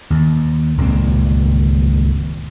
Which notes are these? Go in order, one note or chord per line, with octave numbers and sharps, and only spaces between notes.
D#2
D#1 C#2 G2 C4